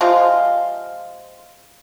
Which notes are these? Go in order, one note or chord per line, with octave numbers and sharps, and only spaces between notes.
C3 F3 G#3 F4